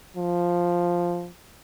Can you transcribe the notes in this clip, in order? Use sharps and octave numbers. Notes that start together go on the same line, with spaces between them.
F3